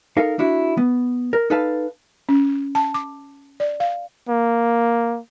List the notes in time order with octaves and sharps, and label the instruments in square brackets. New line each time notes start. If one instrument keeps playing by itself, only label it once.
[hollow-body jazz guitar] D#4 A4 A#4 F5
D4 E4 F#4
B3
A#4
D#4 A4 B4 F5 A5
[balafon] C#4
A5
D6
D5
F5
[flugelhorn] A#3